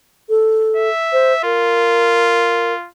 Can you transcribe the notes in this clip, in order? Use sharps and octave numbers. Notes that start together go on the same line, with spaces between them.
A4
E5
C5
F4 A#4